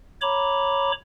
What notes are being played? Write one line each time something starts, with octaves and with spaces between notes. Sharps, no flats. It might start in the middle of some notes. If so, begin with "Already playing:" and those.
C#5 A#5 B5 D6